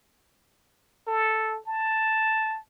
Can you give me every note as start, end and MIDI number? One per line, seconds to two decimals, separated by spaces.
1.07 1.59 69
1.67 2.59 81